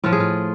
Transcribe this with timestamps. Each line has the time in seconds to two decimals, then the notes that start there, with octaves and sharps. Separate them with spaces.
0.04 A2 F3 F4
0.12 G#4
0.20 F4